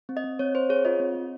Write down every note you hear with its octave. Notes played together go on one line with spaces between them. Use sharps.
C4
D#5
C4
C4 C#5
C4 C5
G#4 C#5
F4 D#5
C4
C4